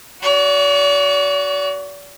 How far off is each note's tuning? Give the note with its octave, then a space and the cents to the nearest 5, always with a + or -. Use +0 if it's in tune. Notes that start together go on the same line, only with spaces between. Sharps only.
F#4 +0 D5 -40